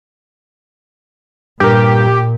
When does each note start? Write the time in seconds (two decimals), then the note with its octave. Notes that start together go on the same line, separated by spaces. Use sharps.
1.60 G2 A#2 G4 A#4